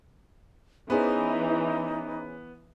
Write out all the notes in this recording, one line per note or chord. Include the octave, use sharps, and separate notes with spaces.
E3 B3 C#4 D#4 G#4 C5